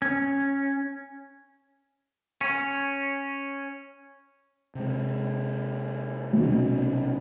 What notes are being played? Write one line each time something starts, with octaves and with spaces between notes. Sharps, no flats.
C#4
C#4
C3 G#3
B1 C3 G3 C#4